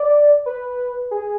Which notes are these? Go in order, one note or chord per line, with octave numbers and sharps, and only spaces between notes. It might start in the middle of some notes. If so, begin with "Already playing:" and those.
Already playing: D5
B4
G#4